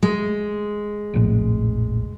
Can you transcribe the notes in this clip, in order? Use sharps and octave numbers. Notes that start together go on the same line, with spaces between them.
G#3
F1 A#1 A2